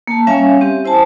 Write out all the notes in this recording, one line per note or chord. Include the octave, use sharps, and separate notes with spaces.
A#3 A5
G3 C#4 C#5 E5 F5 G#5
C4 G4
E4 C5 G#5 A5